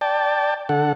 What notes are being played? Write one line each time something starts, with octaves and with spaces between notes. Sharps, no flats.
D5 G5 A5
D3 A4 F#5